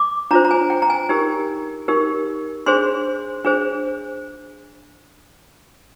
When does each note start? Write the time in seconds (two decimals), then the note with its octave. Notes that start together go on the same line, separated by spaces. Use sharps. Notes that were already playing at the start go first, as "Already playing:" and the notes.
Already playing: D6
0.31 D4 F4 C5 A#5
0.45 A#5
0.51 G#5
0.70 G5
0.82 A#5
0.90 G#5
1.09 D#4 G4 A#4
1.88 D#4 G4 A#4
2.66 D4 G#4 C5 C6
3.44 D4 G#4 C5